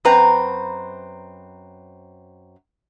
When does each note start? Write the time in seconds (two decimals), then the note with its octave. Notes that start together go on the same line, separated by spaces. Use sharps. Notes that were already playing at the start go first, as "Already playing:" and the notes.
0.05 F#2 C4 B4 A#5